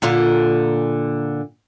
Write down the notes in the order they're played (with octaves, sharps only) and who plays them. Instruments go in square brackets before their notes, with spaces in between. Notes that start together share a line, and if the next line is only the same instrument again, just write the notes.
[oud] A#2 D3 F4